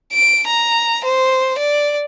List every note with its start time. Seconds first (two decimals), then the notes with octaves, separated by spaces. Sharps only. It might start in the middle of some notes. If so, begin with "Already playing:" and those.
0.13 D7
0.47 A#5
1.05 C5
1.58 D5